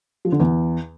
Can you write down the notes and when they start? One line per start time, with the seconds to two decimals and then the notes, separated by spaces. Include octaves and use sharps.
0.25 F3
0.32 D3
0.40 E2